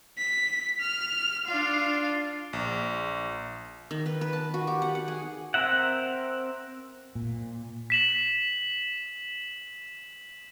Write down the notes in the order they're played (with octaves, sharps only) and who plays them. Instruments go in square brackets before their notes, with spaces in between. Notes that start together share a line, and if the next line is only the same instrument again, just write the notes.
[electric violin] B6
F6
[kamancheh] D4 F4 [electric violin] F5
[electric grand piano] A#1
[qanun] D#3
B4
B4
A5
F#4
G4
F#5
F#5
G#4
[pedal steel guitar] C4 A#4 E5 F#5
[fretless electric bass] A#2
[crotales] B6 E7 F#7